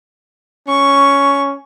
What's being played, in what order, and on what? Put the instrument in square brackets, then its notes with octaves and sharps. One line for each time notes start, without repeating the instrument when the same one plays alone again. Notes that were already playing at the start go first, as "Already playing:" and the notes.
[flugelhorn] C#4 [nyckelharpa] C#6